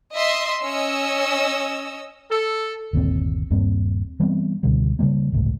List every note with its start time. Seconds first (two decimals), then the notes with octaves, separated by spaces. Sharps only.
0.14 D#5 E5 C6
0.63 C#4 D#5 E6
2.29 A4
2.93 G1 D#2 A#2 C4
3.50 D#1 G2 A#3 C4
4.20 E3 G3 B3 C4
4.63 C#2 B2 D3 G3
4.99 C#3 E3 G3 A#3
5.32 G1 C#2 A2